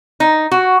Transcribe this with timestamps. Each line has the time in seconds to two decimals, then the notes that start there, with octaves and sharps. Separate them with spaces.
0.20 D#4
0.51 F#4